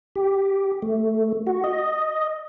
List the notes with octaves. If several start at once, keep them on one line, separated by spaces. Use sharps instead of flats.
G4
A3
F#4
D#5